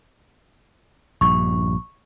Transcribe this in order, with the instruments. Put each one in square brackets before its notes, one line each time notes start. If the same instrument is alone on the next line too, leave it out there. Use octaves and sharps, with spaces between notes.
[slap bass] A#1 G2 [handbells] C#6